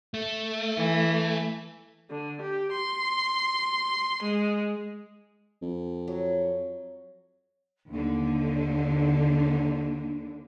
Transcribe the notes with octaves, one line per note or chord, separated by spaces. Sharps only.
A3
E3
D3
G4
C6
G#3
F2
F#3
D#2 D3 D4